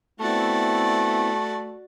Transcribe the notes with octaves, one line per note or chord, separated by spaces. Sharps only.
A3 B3 C4 E4 F#4 D5